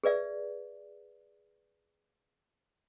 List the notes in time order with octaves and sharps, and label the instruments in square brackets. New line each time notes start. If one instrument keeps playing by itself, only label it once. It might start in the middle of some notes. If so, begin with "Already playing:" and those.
[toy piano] G#4 B4 D5 E5